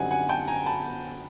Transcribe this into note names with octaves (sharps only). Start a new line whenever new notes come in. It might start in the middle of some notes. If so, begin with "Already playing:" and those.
Already playing: F#2 D3 G3 C4 D#4 F#5 G#5
F#5 G#5
G5 A5
G#5 A#5
A5 B5